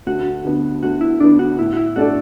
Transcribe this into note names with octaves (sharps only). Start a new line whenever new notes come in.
D2 F#4
D3 B3
D2 F#4
E4
D3 B3 D4
F#4
A2 E4
F#4
E4
A3 D4 F#4 A4 D5